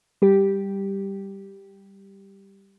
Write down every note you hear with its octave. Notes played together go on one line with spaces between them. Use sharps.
G3 G4